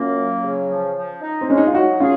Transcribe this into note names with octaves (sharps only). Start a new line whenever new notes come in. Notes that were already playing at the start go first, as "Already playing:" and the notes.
Already playing: F#2 A#3 C#4 F4
F#3
C#3
F3
F3
D#4
C4
G#3 C#4
D#4
F4
F#3 D#4 F#4
C#4 F4 G#4